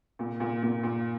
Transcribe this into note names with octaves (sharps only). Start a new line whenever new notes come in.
A#2
A#2
A#2
A#2